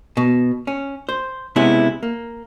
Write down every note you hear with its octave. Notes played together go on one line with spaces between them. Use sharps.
B2
C#4
C5
C3 G#3 B3 C#4 E4
A#3